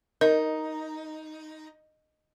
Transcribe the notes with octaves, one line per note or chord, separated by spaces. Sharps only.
D#4 A#4